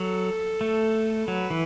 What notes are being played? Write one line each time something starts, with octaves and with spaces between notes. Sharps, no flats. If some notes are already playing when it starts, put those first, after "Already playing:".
Already playing: F#3 A4
A3
F#3 B4
E3